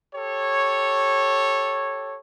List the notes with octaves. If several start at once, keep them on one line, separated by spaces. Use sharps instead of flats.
G4 A4 C#5